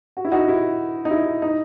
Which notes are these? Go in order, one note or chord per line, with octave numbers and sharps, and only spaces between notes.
F#4
E4
D#4 F#4
E4
D#4
E4
D#4